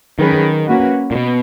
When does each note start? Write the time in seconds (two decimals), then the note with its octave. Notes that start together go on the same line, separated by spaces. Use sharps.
0.19 D#3 F#3 C#4 G#4 B4
0.67 A#3 C#4 F#4 B4
1.11 A#2
1.16 B2